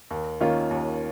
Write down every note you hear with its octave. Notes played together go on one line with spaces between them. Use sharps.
D#2
D#3 A#3 C#4 F4
D#2